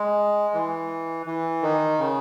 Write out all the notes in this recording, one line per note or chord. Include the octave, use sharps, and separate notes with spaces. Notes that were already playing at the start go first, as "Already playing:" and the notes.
Already playing: G#3
E3
E3
D#3
C#3